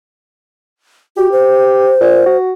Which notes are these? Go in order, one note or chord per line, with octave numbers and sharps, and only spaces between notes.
F#4 G4
C5
A#2
F#4